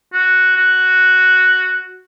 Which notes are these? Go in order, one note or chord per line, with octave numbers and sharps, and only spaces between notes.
F#4
F#4